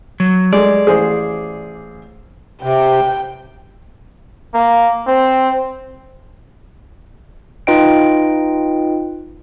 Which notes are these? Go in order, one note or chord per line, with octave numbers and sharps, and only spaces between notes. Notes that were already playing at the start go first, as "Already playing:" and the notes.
F#3
G#3 A4 D5
A1 G#4 C5
C3 G5
A#3
C4
D#4 F4 B4 D#5 G5 D7